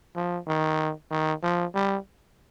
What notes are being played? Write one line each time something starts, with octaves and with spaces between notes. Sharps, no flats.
F3
D#3
D#3
F3
G3